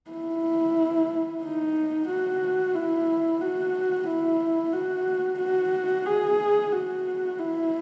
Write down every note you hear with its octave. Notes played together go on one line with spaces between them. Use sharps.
E4
D#4
F#4
E4
F#4
E4
F#4
F#4
G#4
F#4
E4